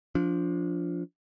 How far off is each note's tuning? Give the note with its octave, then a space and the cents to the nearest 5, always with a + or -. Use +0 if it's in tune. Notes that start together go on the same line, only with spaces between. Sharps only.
F3 +0 D4 -20